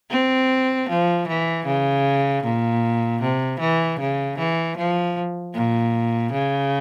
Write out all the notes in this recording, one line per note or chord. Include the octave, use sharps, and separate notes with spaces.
C4
F3
E3
C#3
A#2
C3
E3
C#3
E3
F3
A#2
C#3